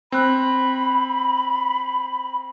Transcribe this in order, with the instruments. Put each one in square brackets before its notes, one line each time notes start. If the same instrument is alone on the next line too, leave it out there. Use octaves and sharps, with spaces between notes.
[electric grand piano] C4 F#6 [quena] B5